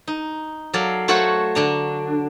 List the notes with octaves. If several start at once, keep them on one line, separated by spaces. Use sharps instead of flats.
D#4
F#3 A4 D5 F5
A3 F#4 A4 C5 C#5 F#5
D3 D4 A#5